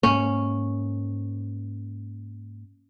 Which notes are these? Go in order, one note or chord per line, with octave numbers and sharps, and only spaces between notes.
G#2 A#3 C#4